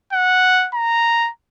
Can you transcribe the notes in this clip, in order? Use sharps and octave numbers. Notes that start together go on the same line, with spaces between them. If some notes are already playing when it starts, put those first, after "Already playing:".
F#5
A#5